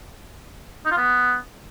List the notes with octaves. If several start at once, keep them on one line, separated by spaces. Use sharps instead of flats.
D#4
F4
B3